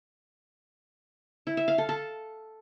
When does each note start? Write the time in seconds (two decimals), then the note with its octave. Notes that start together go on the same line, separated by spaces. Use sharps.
1.47 E4
1.57 E5
1.68 F5
1.78 A4
1.89 A4